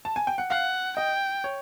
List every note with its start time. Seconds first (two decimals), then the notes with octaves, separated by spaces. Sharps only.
0.05 A5
0.16 G#5
0.27 G5
0.38 F#5
0.50 F5 F#5
0.97 D#5 G5
1.44 C#5